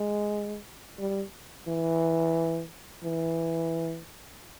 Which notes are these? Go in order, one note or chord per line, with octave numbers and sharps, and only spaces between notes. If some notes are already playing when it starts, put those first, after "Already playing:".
Already playing: G#3
G3
E3
E3